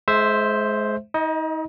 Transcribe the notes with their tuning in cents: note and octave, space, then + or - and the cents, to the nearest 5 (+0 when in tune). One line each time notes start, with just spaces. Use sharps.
G#3 +30 C5 +0 E5 +0
D#4 +40 D#5 +0